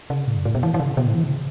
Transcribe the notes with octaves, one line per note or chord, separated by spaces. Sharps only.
C#3
A2
F#2
A2
B2
E3
E3
C#3
B2
A2
E3
C#3